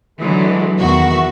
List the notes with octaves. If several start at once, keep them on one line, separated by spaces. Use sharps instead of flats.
D3 E3 F#3 G#3 A3
E2 B2 D#3 F#4 E5